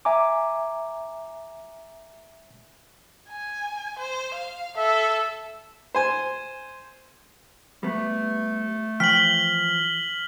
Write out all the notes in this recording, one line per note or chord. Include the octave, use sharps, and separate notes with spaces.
E5 G#5 A#5 D6
G#5
C5
F5
A4 E5
C5 G#5
G3 A3 B3
E3 F3 G5 F6 B6 F#7